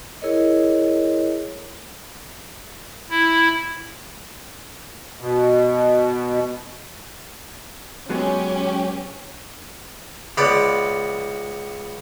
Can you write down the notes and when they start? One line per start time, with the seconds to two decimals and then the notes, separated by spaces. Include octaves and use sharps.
0.22 E4 G#4 A#4 C#5 D#5
3.10 E4
5.21 B2
8.10 F#3 G#3 B3 C#4 G4
10.38 C#2 B3 D5